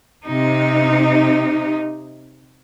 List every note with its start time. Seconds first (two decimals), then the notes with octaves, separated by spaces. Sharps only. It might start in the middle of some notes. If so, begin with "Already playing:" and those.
0.25 C3 D#4